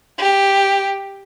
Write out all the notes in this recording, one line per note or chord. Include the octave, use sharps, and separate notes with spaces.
G4